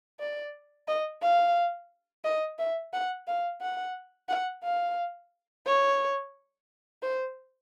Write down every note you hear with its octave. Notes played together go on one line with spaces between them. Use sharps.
D5
D#5
F5
D#5
E5
F#5
F5
F#5
F#5
F5
C#5
C5